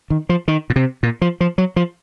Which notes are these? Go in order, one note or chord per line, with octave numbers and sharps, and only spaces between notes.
D#3
F3
D#3
A#2
C3
A#2
F3
F3
F#3
F3